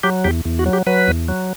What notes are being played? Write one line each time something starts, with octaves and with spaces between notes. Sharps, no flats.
F#3 G4
E2 G4
E2
F#4
F#3
G4
F#3 B4
E2
F#3